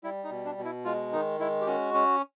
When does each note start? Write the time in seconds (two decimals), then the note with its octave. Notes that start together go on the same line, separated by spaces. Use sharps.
0.04 G3 E4
0.24 D#4
0.30 B2
0.45 D4
0.58 B2
0.65 E4
0.85 G#3 F4
1.13 D#3 D#4
1.40 G#3 E4
1.61 G4
1.67 C#4 F#4
1.94 C#4